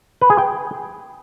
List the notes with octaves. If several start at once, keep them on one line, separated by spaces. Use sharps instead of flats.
B4
G#4
G5